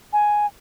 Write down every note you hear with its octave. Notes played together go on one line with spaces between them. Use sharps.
G#5